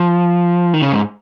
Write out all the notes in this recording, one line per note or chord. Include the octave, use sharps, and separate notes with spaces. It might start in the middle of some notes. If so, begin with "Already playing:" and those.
Already playing: F3
D#3
C#3
G#2